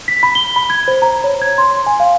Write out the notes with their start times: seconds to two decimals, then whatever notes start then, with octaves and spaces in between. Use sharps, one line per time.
0.08 B6
0.23 B5
0.35 G7
0.56 B5
0.70 G#6
0.88 C5
1.02 A#5
1.24 C#5
1.42 G#6
1.58 C6
1.86 G#5
2.00 F5